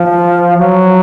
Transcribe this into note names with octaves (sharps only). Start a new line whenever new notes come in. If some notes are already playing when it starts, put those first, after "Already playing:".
Already playing: F3
F#3